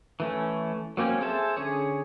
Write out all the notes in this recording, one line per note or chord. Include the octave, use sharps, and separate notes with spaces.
E3 A3 C#4
F#3 A#3 C4 C#4
G#4 A4 C5 E5 A5
D3 C#4 G#4 C#5